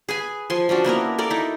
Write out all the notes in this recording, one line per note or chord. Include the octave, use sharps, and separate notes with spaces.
G#4 B4 G#5
F3 G#5 C6
F3 C#4 D4 F#4
A#3 B3 E4 A#4
A4 A#4 D5
D#4 E4